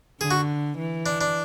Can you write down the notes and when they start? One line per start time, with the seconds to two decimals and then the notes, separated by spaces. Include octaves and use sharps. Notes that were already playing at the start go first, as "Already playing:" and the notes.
0.21 D3 G#4
0.31 F#4
0.78 E3
1.06 D4
1.21 D4